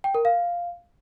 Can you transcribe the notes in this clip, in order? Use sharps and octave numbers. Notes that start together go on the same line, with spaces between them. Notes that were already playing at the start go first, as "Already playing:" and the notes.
G5
A#4
F5